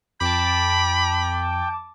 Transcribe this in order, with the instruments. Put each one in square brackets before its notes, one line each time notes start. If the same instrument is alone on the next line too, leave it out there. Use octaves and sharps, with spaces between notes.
[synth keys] F2 [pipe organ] G5 [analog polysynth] A5 D6 [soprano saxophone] B5